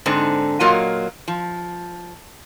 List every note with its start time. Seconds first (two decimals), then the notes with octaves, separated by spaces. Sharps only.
0.06 G#2 D3 C4 D#4
0.60 A#2 F#3 A#3 F4 A#4 D#5
1.28 F3